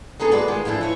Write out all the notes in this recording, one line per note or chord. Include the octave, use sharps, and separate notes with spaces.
G#3 B3 D#4 G#4 A4
G#3 B3 F#4 B4 D5
D#3 G#3 B3 F4
E3 F3 D4 E4 F4
E3 C#5 E5